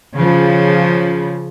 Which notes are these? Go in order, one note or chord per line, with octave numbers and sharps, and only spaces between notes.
C#3 F3